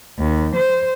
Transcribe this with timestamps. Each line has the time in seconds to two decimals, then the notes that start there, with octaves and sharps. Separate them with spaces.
0.18 D#2
0.56 C5